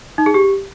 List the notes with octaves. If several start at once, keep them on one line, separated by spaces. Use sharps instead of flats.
D#4
G#4
G4